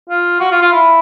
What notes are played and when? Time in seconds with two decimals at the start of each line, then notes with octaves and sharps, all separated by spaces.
0.09 F4
0.40 F#4
0.51 F4
0.62 F4
0.72 E4